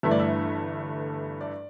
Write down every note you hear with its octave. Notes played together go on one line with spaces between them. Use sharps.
G1 G2 E3 A3 E5
D5
E5
D5